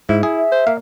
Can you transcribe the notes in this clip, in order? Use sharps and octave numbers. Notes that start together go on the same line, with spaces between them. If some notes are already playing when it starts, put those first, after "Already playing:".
G#2 E4
E4 G#4
E5
C5
A#3 F5